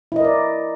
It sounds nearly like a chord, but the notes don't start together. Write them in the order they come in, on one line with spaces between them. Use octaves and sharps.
E4 D#5 A#4 D5